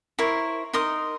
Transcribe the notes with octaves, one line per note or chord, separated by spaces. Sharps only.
E4 A#4 C5 C#5
D#4 A#4 C6 D#6